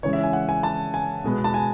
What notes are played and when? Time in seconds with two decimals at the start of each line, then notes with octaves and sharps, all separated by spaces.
0.03 C#3 E3 G#3 C#4 C#5
0.13 E5
0.23 G#5
0.33 F#5
0.49 G#5
0.63 A5
0.94 G#5
1.24 B2 G#3 B3
1.44 A5
1.54 G#5